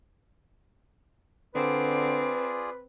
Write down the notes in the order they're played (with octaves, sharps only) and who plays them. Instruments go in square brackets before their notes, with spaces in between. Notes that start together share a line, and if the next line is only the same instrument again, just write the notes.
[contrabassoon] D3 [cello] C4 [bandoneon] F4 G#4 D5 [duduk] B4